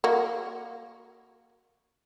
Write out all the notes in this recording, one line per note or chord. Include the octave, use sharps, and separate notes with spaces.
A#3 F#4